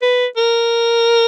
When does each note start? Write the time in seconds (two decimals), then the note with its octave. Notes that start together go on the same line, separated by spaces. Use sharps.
0.02 B4
0.37 A#4